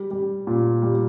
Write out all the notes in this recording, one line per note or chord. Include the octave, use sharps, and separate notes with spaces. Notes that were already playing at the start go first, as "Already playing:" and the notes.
Already playing: G3
G3
A#2
G3